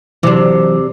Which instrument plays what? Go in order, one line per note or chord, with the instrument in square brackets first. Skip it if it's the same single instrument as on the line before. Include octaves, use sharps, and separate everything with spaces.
[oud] C3 D4 [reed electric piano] E3 F#3